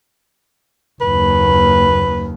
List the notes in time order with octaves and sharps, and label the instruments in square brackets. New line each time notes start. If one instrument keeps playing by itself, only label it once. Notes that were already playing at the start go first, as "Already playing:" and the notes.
[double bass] F#1 D#2 [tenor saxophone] B4